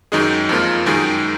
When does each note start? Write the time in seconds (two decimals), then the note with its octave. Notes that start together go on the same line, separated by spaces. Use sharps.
0.12 F#2 D#3 G#3 D#4 G#4
0.49 F2 F3 A#3 F4
0.86 F#2 D#3 G#3 D#4 G#4